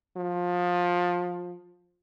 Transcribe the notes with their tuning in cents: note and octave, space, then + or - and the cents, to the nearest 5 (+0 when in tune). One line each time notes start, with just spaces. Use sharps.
F3 +20